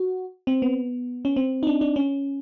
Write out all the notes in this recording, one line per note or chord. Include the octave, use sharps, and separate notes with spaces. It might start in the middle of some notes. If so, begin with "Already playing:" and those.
Already playing: F#4
C4
B3
C#4
C4
D#4
D4
D4
C#4